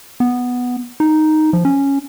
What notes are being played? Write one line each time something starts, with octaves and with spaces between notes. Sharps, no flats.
B3
D#4
F3
C#4